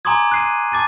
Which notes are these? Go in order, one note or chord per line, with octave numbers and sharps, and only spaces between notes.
G#5 A#5 C6 D6 D#6 G#6
F#6 C7 D#7
A5 D6 A6 D#7